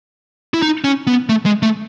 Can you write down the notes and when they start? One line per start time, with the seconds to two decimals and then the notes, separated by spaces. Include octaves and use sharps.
0.54 E4
0.62 D#4
0.84 C#4
1.07 B3
1.29 A3
1.46 G#3
1.62 A3